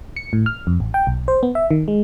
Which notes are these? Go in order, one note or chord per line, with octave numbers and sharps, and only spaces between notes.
C#7
A2
F6
F2
A1
G5
B1
C5
B3
E5
D#3
G#3